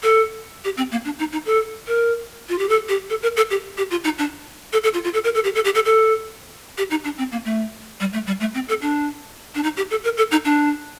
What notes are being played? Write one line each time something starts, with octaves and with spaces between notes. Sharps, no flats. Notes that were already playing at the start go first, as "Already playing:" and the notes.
A4
G4
C4
A#3
D4
D#4
D#4
A4
A#4
F4
G4
A4
G4
A4
A#4
A4
G4
G4
F4
D#4
D4
A4
A4
F4
F4
A4
A#4
A4
G4
A4
G4
A4
A4
G4
D#4
D4
C4
A#3
A3
G3
A3
G3
A3
C4
A4
D4
D4
D#4
G4
A4
A#4
A4
D#4
D4